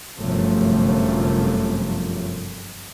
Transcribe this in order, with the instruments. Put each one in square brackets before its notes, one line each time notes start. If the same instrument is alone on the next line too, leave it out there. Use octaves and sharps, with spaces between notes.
[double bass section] G1 F#2 C3 F3 A3